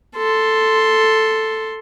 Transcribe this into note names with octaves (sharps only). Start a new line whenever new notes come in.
A4 C6